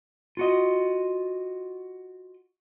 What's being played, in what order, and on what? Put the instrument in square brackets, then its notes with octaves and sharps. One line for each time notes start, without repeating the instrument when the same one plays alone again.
[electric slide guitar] F4 F#4 D#5